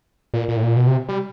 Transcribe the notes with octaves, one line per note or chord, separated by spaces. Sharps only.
A#2
A#2
A2
A#2
B2
C3
G3